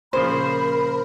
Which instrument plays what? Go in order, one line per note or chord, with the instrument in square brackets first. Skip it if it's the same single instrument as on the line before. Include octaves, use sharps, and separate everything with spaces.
[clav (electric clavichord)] A#2 C#3 F3 [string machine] A#4 [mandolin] C5 [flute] B5